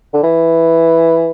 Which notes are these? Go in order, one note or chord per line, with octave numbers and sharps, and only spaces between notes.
D3
E3